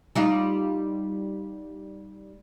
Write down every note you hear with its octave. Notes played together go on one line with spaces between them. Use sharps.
G3 D#4 F4